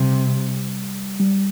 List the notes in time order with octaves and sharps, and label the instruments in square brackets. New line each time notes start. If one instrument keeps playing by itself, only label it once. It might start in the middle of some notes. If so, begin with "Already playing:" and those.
Already playing: [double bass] C3 [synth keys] G3
[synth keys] G3